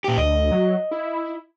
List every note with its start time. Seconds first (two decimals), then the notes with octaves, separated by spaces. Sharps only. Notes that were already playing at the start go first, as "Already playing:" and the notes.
0.04 A#2 G4
0.18 D2 D#5
0.51 F#3
0.91 E4